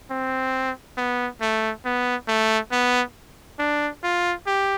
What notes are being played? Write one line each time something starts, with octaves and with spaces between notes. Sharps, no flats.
C4
B3
A3
B3
A3
B3
D4
F4
G4